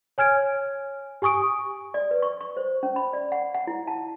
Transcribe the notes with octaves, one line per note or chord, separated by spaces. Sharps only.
C#5 G#5 F6 G#6 D7
G4 G#5 C#6 D#6 D7
D5
B4
C#6
C#6
C5
C#4
B5
D5
F#5
F#5
E4
A5